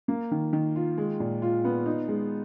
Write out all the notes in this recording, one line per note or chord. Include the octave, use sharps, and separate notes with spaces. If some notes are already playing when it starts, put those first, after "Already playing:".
A#3
D#3
D#3
F4
G#3
A#2
F4
B3
D#4
G#3